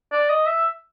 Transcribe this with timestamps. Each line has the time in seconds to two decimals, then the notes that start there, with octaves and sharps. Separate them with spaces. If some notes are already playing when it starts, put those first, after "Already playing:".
0.12 D5
0.30 D#5
0.46 E5